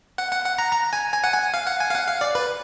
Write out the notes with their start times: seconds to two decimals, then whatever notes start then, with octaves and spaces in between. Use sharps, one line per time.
0.18 F#5
0.32 F#5
0.45 F#5
0.58 A#5
0.72 A#5
0.93 G#5
1.13 G#5
1.24 F#5
1.34 G#5
1.54 F5
1.67 F#5
1.80 G#5
1.90 F5
1.95 F#5
2.08 F5
2.21 D5
2.35 B4